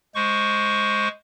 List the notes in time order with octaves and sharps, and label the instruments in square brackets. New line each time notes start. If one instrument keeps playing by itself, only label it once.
[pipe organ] G#3 C5 C#6